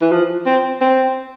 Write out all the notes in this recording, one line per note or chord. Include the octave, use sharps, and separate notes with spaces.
E3
F3
C4
C4